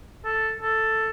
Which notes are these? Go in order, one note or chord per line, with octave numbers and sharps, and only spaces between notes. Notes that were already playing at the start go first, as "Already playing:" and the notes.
A4
A4